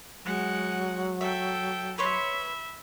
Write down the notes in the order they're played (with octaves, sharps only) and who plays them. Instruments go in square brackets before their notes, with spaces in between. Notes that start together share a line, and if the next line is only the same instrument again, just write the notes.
[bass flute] F#3 [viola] G#3 F#5
[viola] A4 G5 [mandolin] E5
[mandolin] B4 C#5 C6 [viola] E5 B5